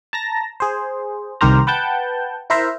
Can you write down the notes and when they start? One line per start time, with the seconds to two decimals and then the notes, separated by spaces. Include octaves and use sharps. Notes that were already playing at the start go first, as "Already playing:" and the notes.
0.13 A5 A#5 A#6
0.60 G#4 C5
1.41 C2 D#3 G4 A#4 C5 A#5
1.67 B4 F#5 G5 A5 G6
2.50 E4 A#4 C5 E5 A#5